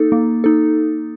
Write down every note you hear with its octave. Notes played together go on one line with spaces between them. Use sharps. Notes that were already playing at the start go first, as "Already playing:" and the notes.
Already playing: A#3 D#4 A4
A#3
D#4 A4